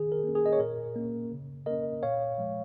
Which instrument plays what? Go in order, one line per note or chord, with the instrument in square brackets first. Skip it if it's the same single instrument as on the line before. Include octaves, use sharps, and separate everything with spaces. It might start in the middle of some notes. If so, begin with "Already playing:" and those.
Already playing: [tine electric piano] D#3 G#4
A#4
A#3 C#4
G#4
D#5
C#5
A#2 A#4
A#3 C#4
C#3
A#3 C#4 A#4 D#5
A#2 C#5 F5
F3 G#3